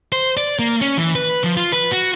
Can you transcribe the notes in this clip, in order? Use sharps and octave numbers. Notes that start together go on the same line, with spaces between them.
C5
D5
A#3
C#4
E3
B4
F3
F4
B4
F#4